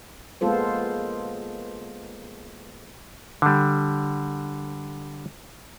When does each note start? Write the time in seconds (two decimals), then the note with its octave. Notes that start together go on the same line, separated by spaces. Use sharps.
0.41 G#3 A#3 B3 F4 A4 C5
3.42 D3 G3